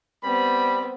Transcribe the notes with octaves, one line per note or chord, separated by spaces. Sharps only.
G3 B3 C4 B5